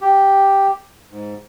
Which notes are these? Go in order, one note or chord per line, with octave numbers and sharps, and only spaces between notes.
G4
G#2